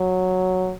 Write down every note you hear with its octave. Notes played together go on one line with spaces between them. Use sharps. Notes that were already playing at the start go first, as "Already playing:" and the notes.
Already playing: F#3